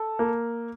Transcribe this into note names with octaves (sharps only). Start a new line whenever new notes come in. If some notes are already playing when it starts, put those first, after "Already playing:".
Already playing: A4
A#3